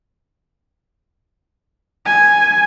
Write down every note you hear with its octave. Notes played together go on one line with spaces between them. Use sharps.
G#5